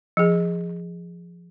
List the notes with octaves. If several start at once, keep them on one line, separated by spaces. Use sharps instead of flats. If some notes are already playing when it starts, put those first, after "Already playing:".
F3 G#4